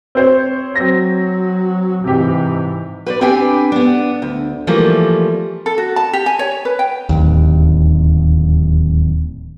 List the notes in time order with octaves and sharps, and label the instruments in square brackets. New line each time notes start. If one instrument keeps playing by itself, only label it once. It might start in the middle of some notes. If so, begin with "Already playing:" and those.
[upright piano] C4 C5 C#5
[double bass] F#3 [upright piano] C4 A#6
[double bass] G#2 E3 [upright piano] C3 G4
[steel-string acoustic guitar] B4 C5 D5
C4 D4 G4 B4 G5 G#5
B3 D4
D2
E3 F3 G3 A3 A#3
[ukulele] A4
F#4
A5
G4
G#5
C#5
B4
G5
[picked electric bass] D1 G1 D#2